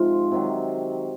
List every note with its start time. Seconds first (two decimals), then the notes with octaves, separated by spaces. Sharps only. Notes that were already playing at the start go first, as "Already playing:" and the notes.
Already playing: G#2 C3 F3 F4
0.31 C3 D#3 F#3